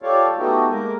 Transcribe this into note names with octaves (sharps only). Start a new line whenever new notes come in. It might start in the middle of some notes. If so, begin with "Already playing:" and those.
F4 G4 A4 C#5 D5 F5
A3 B3 D#4 F#4 G4 A4
G#3 A#3 A#4